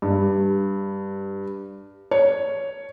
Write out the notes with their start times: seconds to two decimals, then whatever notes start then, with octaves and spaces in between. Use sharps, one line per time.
0.02 G2
2.11 C#5